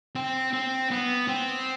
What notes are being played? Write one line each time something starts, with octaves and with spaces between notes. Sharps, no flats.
C4
C4
B3
C4